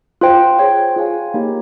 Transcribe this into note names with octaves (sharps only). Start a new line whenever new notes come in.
F4 C5 G5
G#4 C#5 G5
F4 G#4 C#5 F5 G#5
A#3 D#4 G4